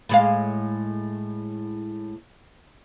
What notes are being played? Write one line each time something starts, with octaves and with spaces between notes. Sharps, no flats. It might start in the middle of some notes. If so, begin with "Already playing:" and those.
A2 G#3 F5